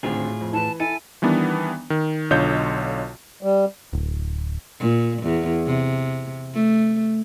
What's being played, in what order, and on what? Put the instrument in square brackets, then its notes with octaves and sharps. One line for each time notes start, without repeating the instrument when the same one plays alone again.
[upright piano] G#1 D2 C4 [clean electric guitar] A2 F4 G#4
[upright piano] F2
[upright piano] E3 B4 [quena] A5
[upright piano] E4 D#7 [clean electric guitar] A4 [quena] G#5
[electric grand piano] D#3 E3 G3 B3 D4
D#3
B1 D3 F4 C#5 D#5 G6
[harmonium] G3
[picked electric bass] D1
[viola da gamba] A#2
E2
C3
A3